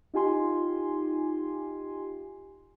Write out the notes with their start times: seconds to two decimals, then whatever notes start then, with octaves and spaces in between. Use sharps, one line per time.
0.14 D#4 F4 G4 G#5 C6